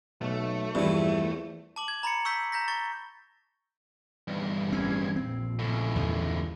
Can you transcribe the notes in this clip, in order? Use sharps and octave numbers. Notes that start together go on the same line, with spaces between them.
B1 B2 A3
E2 G2 E3 F3 C4 E4
A5 D6 F#7
G#6
A#5 B5 A6 C#7
C#6 E6 G6 B6
A#5 G6 A#6 B6
C#6 A6 G7
E2 G2
A1 C4 C#4 G#6
A#1 F2 C4
C#2 A2
E2 G2 D3